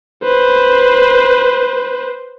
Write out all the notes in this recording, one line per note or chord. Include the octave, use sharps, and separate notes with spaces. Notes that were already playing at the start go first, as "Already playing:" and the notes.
B4 C5